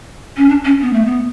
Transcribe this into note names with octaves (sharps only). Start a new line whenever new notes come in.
C#4
D4
C#4
B3
A3
B3